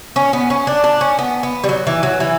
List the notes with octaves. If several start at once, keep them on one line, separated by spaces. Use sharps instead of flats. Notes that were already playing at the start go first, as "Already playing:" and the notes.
C#4
B3
C#4
D4
D4
C#4
B3
B3
G3
F#3
E3
F#3
E3